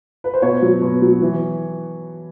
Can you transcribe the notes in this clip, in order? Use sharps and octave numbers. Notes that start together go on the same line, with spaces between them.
B4
C5
B2 B4 C#5
F#3
B2
F#3
E3